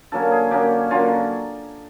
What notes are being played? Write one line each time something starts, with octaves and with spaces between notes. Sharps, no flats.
D3 F#3 A#3 C#4 A4
G#4
D3 F#3 A#3 C#4 G4
D3 F#3 A#3 C#4 F4